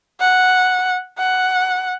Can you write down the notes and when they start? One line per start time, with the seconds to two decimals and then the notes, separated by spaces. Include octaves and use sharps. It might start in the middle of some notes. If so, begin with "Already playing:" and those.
0.20 F#5
1.18 F#5